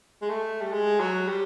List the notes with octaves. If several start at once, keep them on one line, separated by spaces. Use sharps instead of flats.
G#3
A3
G3
G#3
F#3
G3